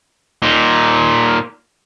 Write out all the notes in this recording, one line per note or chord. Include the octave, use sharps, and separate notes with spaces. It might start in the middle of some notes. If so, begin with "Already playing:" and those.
A#2 D#4